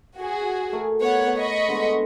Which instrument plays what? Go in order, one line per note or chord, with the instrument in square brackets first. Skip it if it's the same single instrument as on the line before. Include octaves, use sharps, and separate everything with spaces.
[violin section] F#4 G#4
[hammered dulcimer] A3 A#4
[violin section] B3 C#5 F#5
D#5 B5 C#6
[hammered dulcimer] D3 G#3 B3